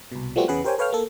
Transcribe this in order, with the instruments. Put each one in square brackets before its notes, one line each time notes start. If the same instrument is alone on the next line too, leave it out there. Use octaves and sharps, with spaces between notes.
[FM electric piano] C2 B2
F3 G3 A3 B3 C4 F#4
E2 C#3 G#4 B4 F#5 F#6
G4 A#4 C5 C#5 G5 G#5
A4 B4 C#5 F5 G5 F6
A#3 A4